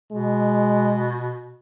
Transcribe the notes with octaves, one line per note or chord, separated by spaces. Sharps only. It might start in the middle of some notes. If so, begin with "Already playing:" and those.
B2 G#3